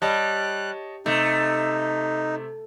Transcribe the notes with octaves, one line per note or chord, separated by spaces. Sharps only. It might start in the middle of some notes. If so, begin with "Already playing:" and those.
G3 C#5 D#5 A5 F#6
C3 A3 D#4